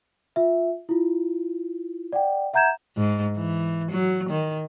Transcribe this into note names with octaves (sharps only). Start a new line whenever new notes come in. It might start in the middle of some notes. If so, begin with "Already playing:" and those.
F4 E5
E4 F4
D5 F#5 G5
E5 F#5 A#5 G6 G#6 E7
G#2
E3
F#3
D#3